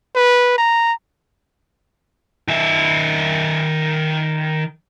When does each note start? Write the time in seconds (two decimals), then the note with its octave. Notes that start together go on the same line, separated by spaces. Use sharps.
0.15 B4
0.58 A#5
2.48 D#3 E5